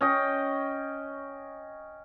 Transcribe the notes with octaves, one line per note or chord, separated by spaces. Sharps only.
C#4 D#5 G5